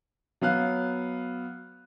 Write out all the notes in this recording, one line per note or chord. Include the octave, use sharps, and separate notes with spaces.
F#3 B3 F5 F#6